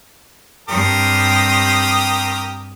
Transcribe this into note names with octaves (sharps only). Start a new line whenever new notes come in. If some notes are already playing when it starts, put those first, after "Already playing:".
G2 C4 G4 A#4 D#6